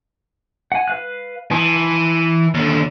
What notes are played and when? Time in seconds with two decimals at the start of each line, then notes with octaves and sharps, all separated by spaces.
0.72 F#5 G#5
0.88 B4 F5 F#6
1.51 E3 A5 C6 D#6
2.54 D#2 D3